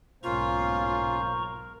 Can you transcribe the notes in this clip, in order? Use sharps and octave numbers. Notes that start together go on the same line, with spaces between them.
B1 G#2 A#3 C#4 F4 C5 A#5 C#6
A#4